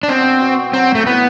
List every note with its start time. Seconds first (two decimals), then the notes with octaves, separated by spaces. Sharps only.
0.03 D4
0.09 B2 C4
0.41 F#4
0.73 F#3 C4
0.95 A3
1.06 B3 E4